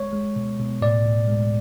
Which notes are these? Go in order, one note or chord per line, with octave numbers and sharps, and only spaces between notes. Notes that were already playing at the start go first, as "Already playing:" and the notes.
Already playing: G#3 C#5
G#3
B2
B2
A2 D5
A2
G#3